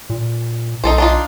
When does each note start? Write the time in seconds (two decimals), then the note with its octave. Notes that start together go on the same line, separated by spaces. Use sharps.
0.10 A#2
0.84 B1 D#4 A4 C5
0.98 D4 D#4 F4